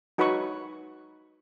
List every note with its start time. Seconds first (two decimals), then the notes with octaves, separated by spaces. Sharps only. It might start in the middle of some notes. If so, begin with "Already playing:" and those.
0.18 D#4 F#4 B4 C#5 B5 C#6